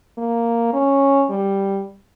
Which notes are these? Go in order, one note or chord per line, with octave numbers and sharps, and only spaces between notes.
A#3
C#4
G3